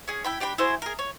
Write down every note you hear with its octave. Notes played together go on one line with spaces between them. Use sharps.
C#4 G#4
E4 G5 B5
D4 G4 G5 B5
E4 F#4 G#4 C5
G#4 A#4
C#5